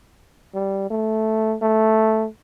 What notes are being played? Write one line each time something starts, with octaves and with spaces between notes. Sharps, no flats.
G3
A3
A3